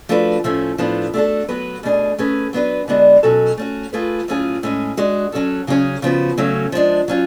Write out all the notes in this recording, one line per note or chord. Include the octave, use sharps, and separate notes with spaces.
F3 A3 D4 F#4 B4
A2 F3 A3 C#4
A2 F3 B3 D4
A3 D4 F#4 A4
F#3 B3 F#4 B4
B2 A3 D4 G#4
A3 C#4 G#4 B4
F#3 B3 D4 F#4 B4
D3 G#3 B3 D4 F#4
B2 F#3 C#4 F#4 A4
A3 C#4 F#4
A3 F4 G#4 B4
A2 F#3 C#4 F4 G#4
A2 G#3 C#4 G#4
G#3 D4 F#4
F#3 C#4 F#4 A4
C#3 F#3 C#4 G#4
C#3 F3 B3 F#4
C#3 F#3 A3 C#4 F#4
F3 G#3 D4
F#3 C#4 F4